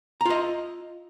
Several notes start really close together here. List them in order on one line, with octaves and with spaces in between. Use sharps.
A#5 F4 D#5